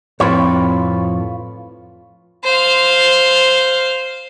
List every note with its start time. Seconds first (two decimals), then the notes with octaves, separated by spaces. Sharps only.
0.20 F2 A2 C4 F4 B4 C#5
2.44 C5 F5